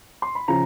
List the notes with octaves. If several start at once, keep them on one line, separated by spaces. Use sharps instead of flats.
C6
B5
C#3 F3 A#5